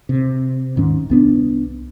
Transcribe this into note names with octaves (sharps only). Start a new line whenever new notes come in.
C3
D#1 G#2 D#3 C#4
C2 B3 D4